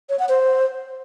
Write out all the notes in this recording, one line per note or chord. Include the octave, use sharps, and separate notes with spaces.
C#5
F#5
C5